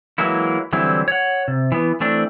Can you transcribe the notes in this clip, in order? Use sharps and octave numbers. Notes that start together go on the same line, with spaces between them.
E3 F#3 G#3 A#3 E4
D3 E3 F#3 G3 C4 E4
C#5 F#5
C3
E3 B3
E3 A3 C4 D4